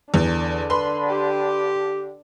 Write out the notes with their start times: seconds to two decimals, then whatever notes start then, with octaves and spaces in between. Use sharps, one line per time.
0.14 E2 D3
0.70 B4 B5 C6
1.08 G4